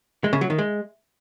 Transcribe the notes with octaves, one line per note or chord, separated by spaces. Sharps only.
G#3
C#3
F#3
D#3
G#3